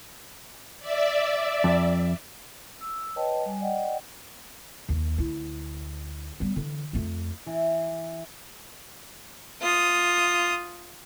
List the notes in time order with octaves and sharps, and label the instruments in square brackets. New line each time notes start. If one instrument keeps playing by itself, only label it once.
[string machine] D5 E5
[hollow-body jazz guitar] F2
[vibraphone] E6
B4 C#5 D#5 G5 A5
G3 G#5
D5 D#5 F#5 G5
[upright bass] D#2 A#3
D2 E4
G3 B3
D3 E3
F2 A3
[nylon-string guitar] E3
[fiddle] F4 D#6